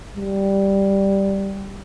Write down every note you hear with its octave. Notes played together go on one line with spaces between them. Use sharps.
G3